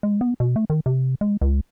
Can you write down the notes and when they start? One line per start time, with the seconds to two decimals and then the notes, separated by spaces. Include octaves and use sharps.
0.03 G#3
0.21 B3
0.40 B2
0.56 A3
0.70 D#3
0.86 C3
1.21 G#3
1.41 C#2